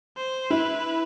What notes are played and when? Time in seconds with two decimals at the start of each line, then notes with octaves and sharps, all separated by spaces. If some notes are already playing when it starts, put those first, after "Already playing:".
0.17 C5
0.50 E4 B4